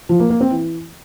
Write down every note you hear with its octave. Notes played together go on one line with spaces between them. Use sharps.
F3
A#3
A#3
C4
E3